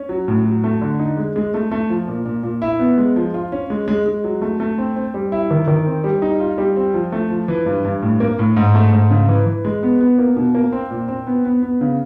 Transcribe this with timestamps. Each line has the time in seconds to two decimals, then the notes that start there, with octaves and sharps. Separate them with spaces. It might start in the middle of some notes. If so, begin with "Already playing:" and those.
Already playing: C#4
0.09 F#3
0.28 A2
0.45 F#3
0.64 A3
0.81 D3
0.99 D#4
1.17 G#3
1.36 G#3
1.54 A3
1.71 A3
1.90 F3
2.08 A#2
2.25 A#2
2.43 A#2
2.62 E4
2.79 B3
2.98 G#3
3.16 F3
3.34 F4
3.52 C#4
3.70 G#3
3.88 G#3
4.06 G#3
4.24 F#3
4.42 A3
4.60 A3
4.78 C4
4.96 C4
5.14 G3
5.32 E4
5.51 D#3
5.68 D#3
5.87 C4
6.04 G3
6.22 D#4
6.40 F4
6.58 G3
6.76 C4
6.94 F3
7.12 A3
7.30 F3
7.48 E3
7.66 G2
7.85 G2
8.02 A2
8.20 A#3
8.39 A2
8.57 G#2
8.75 A3
8.92 G#2
9.10 C#3
9.29 E3
9.46 E3
9.65 G#3
9.83 B3
10.01 B3
10.18 A#3
10.36 B2
10.55 A#3
10.72 C4
10.91 A#2
11.08 C4
11.27 B3
11.45 B3
11.62 B3
11.81 C#3